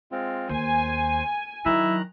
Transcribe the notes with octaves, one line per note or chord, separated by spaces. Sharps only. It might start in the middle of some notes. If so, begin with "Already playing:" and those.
G#3 C4 F4
D#2 C5 G#5
D#3 F#3 E4 A#5 F#6